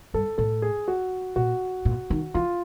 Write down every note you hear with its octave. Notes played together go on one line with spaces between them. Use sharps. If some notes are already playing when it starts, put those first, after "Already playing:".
G2 A4
A2 A4
G#4
F#4
A#2 F#4
A#2
D#3
E3 F4